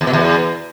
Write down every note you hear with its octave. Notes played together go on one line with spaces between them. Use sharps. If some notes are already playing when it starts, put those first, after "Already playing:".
E2
B2
E2